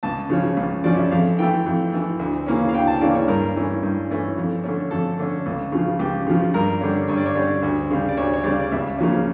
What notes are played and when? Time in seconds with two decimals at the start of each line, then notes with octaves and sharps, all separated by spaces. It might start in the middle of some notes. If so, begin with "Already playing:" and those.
0.03 C#2 A5
0.30 C#3 F3 C#4
0.57 C#2
0.84 C#3 F3 C#4 D5
0.97 E5
1.11 F2 F5
1.39 E3 A3 G5
1.66 F2
1.93 E3 A3
2.19 D2
2.46 C#3 E3 A#3 C#4
2.69 F5
2.74 D2 G5
2.87 A5
3.01 C#3 E3 A#3 C#4 D5
3.15 C#5
3.28 G2 A#4
3.56 E3 A3 C#4
3.83 G2
4.10 E3 A3 C#4
4.38 F2
4.64 D3 A3 C#4
4.91 F2 A4
5.19 D3 A3 C#4
5.46 C#2
5.72 C#3 F3
5.99 C#2 G4
6.27 C#3 F3
6.54 G2 A#4
6.81 D3 G3 C#4
7.08 G2 C#5
7.17 D5
7.26 C#5
7.35 D3 G3 C#4
7.63 D2
7.90 C#3 G3
8.09 D5
8.17 D2 C#5
8.33 C#5
8.44 C#3 G3 D5
8.60 D5
8.72 C#2 E5
8.98 C#3 F3 A#3 C#4